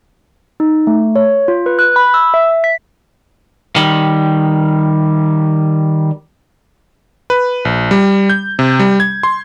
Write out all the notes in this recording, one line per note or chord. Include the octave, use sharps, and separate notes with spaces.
D#4
A3
C#5
F4
B4
F#6
B5
E6
E5
B6
D#3 G3
B4
A#1
G3
G6
C3
G3
G#6
C6